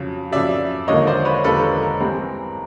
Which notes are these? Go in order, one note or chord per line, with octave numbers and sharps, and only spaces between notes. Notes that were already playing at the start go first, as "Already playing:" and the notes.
Already playing: F2 C#3 F#3
F2 C#3 F#3 D5 E5
E1 D#2 D3 F3 A#3 C#5 D#5
C5 D5
B4 C#5
E1 D#2 D3 F3 A#3 A4 B4
A#4
A4
A#4
G2 E3 G#3 C4